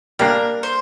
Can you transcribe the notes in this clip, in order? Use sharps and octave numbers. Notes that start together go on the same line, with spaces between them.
G3 A#3 D4 A#4
C5